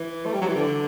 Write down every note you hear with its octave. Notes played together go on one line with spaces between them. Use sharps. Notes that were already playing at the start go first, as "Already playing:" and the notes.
Already playing: E3
A3
G3
F#3
E3
D3